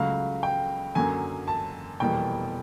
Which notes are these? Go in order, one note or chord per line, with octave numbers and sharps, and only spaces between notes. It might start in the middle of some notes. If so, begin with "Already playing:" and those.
Already playing: C#2 C#3 F#3 A3 F5
G5
F#2 D3 F#3 A#3 G#5
A5
F1 E2 B2 G3 A#3 G5